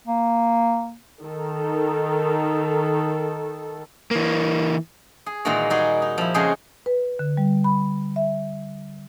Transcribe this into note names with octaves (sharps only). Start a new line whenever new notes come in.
A#3
D#3 A4
E3 A#3
G#4
A#2 D#3 E3 G#3 A#3 F#4
G3 D#4 F#4 G#4
D#4
F3 E4
F2 C#3 G#3 F#4 G#4 C5
B4
D3
G3
B5
E5